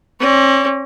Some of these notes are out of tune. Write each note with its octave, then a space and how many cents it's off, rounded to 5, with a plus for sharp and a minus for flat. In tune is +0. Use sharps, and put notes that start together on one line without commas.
C#4 -45 C#5 +45